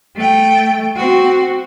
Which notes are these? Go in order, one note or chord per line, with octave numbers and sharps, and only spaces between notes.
A3 G5
C4 F#4